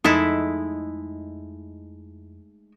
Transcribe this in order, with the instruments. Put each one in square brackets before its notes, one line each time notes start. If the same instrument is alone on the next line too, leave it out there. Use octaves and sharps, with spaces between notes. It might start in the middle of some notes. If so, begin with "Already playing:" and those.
[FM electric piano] F2 [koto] G#3 A3 E4 [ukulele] D#4